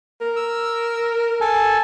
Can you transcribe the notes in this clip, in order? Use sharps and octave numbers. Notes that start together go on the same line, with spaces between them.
A#4
E6
A4 G#5 A5